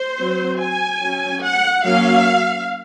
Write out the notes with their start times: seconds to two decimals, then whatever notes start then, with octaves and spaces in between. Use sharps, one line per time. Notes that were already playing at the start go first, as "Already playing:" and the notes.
Already playing: C5
0.19 F#3 C4
0.60 G#5
1.02 F#3 C#4
1.43 F#5
1.85 F#3 A#3 C#4 F5